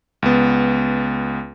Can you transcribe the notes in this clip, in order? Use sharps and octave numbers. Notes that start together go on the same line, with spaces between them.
C#2 B3